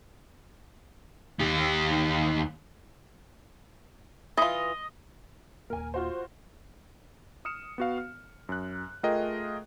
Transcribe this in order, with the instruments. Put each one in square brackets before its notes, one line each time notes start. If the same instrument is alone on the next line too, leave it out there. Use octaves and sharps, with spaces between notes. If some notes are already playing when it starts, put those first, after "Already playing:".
[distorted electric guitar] D#2 G4
[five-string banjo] E3 F4 [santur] D#5
[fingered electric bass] D#1 E2 A#3 [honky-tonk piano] A#4 G#5
[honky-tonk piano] F4 F#4 C5
[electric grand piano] D#6 F6 C#7 E7
B3 F#4 F5
F6
F#2 F#6
A3 F4 G#4 A#4 D#5 G5